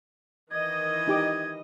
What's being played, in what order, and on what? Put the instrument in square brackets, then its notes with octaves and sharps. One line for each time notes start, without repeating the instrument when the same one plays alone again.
[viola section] D#3 E3 D#5 [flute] G#6
[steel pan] D#4 G4 D6